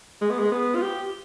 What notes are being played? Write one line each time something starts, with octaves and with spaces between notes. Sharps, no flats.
G#3
B3
G#3
B3
F4
G4